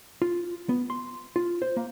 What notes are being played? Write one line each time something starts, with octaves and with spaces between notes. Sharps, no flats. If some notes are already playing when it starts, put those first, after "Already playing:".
F4
B3
C6
F4
C5
A#3